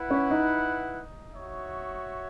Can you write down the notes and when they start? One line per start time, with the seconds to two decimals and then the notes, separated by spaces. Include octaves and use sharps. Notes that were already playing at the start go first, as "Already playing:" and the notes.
Already playing: E4 B4 F#5
0.11 C#4
0.31 D#4
1.34 F#4 C#5 E5